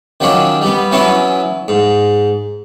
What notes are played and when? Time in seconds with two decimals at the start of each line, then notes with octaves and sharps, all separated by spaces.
0.20 D#3 F3 F#3 C#4 D4
0.61 G3 B3
0.92 E3 F#3 B3 C#4 E4
1.68 G#2